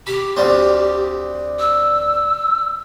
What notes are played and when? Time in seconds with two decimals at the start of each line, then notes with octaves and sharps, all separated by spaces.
0.07 G4 B5
0.37 D2 G3 C4
1.60 E6